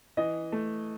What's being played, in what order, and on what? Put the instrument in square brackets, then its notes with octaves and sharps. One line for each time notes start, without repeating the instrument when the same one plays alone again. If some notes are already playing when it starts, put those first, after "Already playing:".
[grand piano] E3 [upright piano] D#5
[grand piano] A3